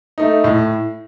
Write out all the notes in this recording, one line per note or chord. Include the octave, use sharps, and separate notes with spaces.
A3 D#4
A2